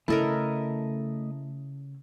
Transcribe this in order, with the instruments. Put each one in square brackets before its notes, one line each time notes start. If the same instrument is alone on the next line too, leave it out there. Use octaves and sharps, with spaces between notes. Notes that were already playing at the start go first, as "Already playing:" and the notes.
[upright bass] C#3 [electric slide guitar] A3 D#5 [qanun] E4 A4 A#4